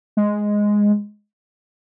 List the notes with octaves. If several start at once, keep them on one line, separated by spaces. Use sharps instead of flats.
G#3